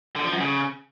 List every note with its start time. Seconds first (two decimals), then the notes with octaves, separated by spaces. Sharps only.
0.16 D3
0.24 F3
0.32 F#2
0.41 C#3